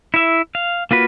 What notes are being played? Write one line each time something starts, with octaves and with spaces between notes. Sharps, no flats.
E4 E5
F5
A#3 F4 F#4 B4